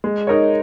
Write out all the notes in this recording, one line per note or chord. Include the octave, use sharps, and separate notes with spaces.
G#3
D#4 A#4 C#5